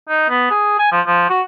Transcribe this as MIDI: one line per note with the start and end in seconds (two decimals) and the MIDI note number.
0.09 0.27 63
0.29 0.48 59
0.51 0.76 68
0.79 0.87 80
0.92 1.01 53
1.06 1.30 53
1.30 1.42 66